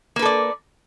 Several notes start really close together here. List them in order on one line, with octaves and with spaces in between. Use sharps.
A#3 B4 A4 D5